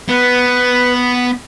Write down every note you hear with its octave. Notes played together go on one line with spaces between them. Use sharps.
B3 B4